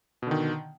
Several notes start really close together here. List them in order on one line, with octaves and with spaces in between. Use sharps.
B2 D3 D#3